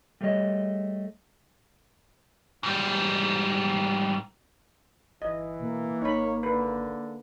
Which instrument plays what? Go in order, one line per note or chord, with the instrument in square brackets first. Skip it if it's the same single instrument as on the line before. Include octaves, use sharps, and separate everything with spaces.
[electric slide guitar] G3 A3 G#4 C#5 D#5
[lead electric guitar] G#2 G3
[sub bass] G1 [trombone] E3 [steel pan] D#5
[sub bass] B2 [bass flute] A#3
[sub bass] G#1 [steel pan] D#4 B5 [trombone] C#5
[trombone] D3 [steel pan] B4